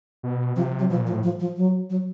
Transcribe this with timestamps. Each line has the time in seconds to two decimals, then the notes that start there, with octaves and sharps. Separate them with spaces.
0.23 B2
0.56 C3 F3
0.79 F#3
0.90 B2 F3
1.00 A#2
1.07 F3
1.11 A2
1.23 F3
1.40 F3
1.56 F#3
1.90 F#3